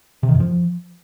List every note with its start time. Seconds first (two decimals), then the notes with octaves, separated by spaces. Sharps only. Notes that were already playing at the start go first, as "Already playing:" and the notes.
0.23 C3
0.29 D#3
0.34 F#2
0.40 F3